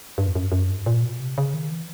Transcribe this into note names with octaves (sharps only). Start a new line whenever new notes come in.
G2
F2
F#2
F#2
G2
A#2
B2
C3
C#3
D#3
E3